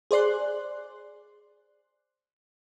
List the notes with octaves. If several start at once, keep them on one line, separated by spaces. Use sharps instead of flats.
G#4 C5 D5 C6 F#6